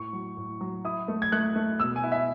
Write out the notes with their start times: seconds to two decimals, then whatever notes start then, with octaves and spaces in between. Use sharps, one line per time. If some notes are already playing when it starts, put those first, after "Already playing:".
Already playing: A2 C#6
0.13 F#3
0.37 A2
0.61 F#3
0.85 E4 D#6
1.08 A3
1.22 G#6
1.32 A3 F#6
1.55 A3
1.80 B2 E6
1.96 G#5
2.04 E4
2.12 E5